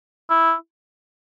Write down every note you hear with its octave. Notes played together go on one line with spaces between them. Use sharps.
E4